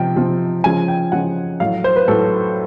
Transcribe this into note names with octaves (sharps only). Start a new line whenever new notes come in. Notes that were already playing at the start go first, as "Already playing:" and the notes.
Already playing: C3 F3 G5
C3 F3
C#3 F3 G#5
G5
C#3 F3 F#5
A2 F#3 F5
C5
B4
A2 F#3 A4